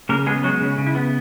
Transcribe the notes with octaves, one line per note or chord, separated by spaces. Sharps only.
C#3 A#3 A#4
G#3 B3 G#4
F#3 G#3 F#4
C#3
C#3
E4
B3